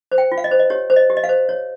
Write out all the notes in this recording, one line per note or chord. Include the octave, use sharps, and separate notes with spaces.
C5
G5
F4
F5
D#5
C5
D#5
G4 C#5
C5
D#5
G4
D#5
F5
C5
C#5